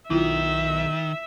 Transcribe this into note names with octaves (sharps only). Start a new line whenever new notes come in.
B1 D#3 E4 F4 E5